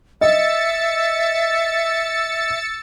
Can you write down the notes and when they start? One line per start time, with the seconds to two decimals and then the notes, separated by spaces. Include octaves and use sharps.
0.21 D#5 E5 E6 A6 C#7